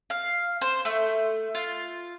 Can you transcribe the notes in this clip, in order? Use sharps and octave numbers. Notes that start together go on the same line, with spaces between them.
F5
C5
A3
F4